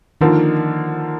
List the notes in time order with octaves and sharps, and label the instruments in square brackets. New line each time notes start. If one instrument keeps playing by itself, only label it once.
[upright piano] D3 F3 A#3 [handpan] D#3